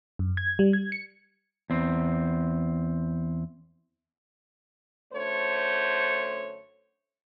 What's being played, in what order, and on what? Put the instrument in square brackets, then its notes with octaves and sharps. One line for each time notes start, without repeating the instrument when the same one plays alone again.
[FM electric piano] F#2
G#6
G3
G#6
C#7
[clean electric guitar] E2 C4
[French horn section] F#2 D3 A3 C5 C#5